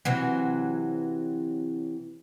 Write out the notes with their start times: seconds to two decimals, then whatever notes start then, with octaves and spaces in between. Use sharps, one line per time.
0.05 C3 E3 F#3